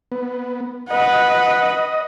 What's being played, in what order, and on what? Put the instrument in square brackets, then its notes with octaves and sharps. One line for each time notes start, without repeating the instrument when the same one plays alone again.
[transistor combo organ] B3
[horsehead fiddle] B4 F#5 [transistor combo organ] D#5